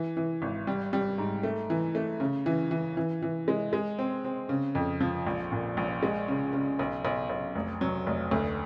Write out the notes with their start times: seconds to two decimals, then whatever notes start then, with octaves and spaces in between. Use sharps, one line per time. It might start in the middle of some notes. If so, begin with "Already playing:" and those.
Already playing: E3
0.17 E3
0.42 G#1
0.67 G3
0.93 G3
1.18 G#2
1.43 A3
1.70 E3
1.95 A3
2.20 C#3
2.46 E3
2.71 E3
2.97 E3
3.22 E3
3.48 G#3
3.73 G#3
3.99 C4
4.25 C4
4.49 C#3
4.75 F2
5.01 F3
5.26 A#1
5.52 A#2
5.77 A#1
6.03 G#3
6.28 C#3
6.53 C#3
6.79 B1
7.05 B1
7.29 B1
7.55 F1
7.81 F#3
8.07 F1
8.31 D2